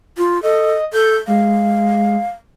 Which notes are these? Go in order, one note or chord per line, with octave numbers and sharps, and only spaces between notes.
F4
A4 D#5
A4 G6
G#3 F5